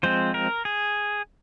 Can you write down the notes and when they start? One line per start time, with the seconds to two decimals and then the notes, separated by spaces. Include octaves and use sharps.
0.03 F3 G#3 C4 C5
0.34 A#4
0.65 G#4